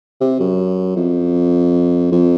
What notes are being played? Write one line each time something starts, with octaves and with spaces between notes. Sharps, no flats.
C3
F#2
F2
F2